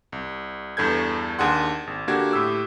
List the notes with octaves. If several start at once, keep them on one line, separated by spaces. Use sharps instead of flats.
C2
E2 G2 A4 G6 G#6
D#2 D4 G#4 F#5 C6
G#1
D3 A#3 D4 F#4 G4 G#6
A2 G4 E6